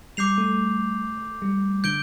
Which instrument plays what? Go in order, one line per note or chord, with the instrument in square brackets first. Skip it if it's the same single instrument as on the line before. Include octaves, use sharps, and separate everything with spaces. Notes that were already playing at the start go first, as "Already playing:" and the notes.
[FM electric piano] G3 [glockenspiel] D6 G6 C7 F7
[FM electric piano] A3
G3
[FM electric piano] D3 [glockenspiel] G6 D7 G7